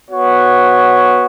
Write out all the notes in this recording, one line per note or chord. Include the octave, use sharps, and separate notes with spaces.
B3 F#4 C#5